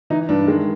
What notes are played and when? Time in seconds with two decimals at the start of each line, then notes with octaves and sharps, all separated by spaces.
0.10 E3 D#4
0.29 G2 D4
0.48 D#3 G#3